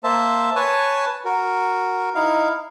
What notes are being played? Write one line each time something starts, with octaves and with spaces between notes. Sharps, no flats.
A#3 C5 E5 A5
B4 C#5 G#5 A5
F#4 A#4
D#4 E4 F5